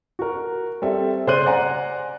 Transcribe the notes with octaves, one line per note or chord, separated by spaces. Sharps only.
F#4 A#4
G3 C4 A4 E5
C#3 C5 D5 C6 F#6 D#7
D5 F#5 G#5 A#5